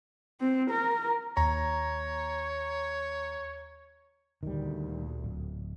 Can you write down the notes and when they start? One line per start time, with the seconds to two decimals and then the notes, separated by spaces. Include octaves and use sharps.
0.41 C4
0.71 A#4
1.37 D#2 C#5 A#5
4.43 D2 A#2 D#3 G3
5.24 D1